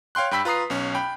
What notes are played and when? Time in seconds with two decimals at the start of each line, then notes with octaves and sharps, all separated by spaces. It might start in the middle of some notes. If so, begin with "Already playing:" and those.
0.15 C#5 F5 G5 C6 F#6
0.31 G2 G5 B5 E6 B6
0.45 F4 B4 A#5 D#6 C7
0.70 B1 C#4
0.95 G5 B5